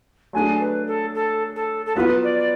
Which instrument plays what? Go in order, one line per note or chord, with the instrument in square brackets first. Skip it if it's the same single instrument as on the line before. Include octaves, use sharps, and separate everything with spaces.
[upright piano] F#3 A3 D4 G#4 [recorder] G#5
[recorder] B4
A4
A4
A4
A4
[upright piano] F#3 B3 F4 [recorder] B4
[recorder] D5
D5